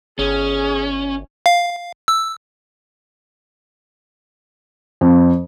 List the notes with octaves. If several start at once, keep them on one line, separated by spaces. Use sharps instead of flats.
G1 C#4 G#4
F5
E6
F2